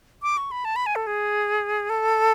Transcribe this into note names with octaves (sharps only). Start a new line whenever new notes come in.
D6
C#6
B5
A5
B5
G#5
A4
G#4
A4